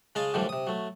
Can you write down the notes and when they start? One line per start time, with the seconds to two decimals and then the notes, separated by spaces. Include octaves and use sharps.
0.15 C#3 G#3 D#5 F5 G#5 A5
0.34 F#2 A2 D3 E3 F3 G3
0.49 C3 D#6
0.67 F#3 A3